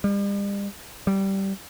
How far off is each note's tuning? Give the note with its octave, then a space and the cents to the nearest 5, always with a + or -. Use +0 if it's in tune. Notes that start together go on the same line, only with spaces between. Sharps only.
G3 +40
G3 -15